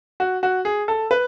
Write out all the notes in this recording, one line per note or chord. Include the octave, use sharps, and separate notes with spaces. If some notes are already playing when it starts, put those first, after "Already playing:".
F#4
F#4
G#4
A4
B4